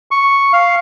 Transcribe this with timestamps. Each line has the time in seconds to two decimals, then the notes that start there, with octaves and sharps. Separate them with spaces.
0.11 C#6
0.53 F5